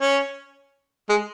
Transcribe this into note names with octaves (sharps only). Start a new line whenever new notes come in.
C#4
G#3